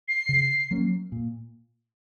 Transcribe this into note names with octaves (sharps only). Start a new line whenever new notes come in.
C7
C#3
F#3 A#3 C#4
A#2